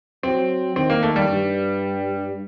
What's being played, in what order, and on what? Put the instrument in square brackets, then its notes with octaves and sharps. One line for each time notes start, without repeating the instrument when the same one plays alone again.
[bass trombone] F#3 [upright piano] C4
[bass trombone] D#3 [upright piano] C4
[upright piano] A#3
A3
G3
[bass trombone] G2